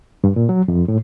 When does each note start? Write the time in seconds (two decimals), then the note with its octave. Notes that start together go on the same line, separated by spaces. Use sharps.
0.24 G2
0.36 A#2
0.49 F#3
0.68 F2
0.88 A2